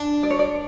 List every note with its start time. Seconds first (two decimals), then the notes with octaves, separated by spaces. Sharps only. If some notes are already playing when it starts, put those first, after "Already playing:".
Already playing: D4
0.23 D5
0.30 C#5
0.39 D5